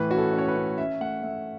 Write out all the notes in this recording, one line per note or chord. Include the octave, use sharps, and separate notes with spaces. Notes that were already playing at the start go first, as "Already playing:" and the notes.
Already playing: A2 E3 B4
C#4 F#4
A4
C#4
C#5
B4
C#4
C#4 E5
A3 F#5
A3 E5